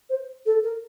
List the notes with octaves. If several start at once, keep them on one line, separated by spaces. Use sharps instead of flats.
C5
A4
A#4